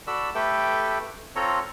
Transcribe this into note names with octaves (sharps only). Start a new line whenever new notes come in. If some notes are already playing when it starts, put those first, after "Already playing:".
F#4 A4 D5 B5 E6
A3 G4 A4 B4 G5
C4 F4 A4 C#5 A#5